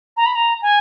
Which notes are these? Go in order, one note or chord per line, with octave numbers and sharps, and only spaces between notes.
A#5
B5
A#5
G#5